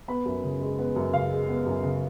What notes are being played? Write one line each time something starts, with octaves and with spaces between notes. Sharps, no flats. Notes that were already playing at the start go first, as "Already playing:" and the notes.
B3 B5
F#2
C#3
G#3
B3
F#2
C#3 F5
G#3
B3
F#2
C#3